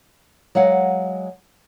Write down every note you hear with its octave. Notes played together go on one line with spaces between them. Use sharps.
F#3 G#3 F5 F#5